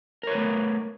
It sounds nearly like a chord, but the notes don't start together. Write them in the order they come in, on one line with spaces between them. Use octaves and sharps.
A#4 C#5 B4 A3